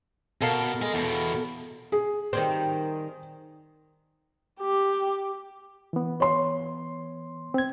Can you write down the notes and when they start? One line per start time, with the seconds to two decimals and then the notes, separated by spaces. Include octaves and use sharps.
0.42 B2 A4 A#4 F5
0.82 G#4 D#5
0.94 E2 B2
1.92 G#4
2.33 D#3 G3 C4
4.61 G4
5.93 E3 B3
6.20 C#5 C6
7.54 C4 G#6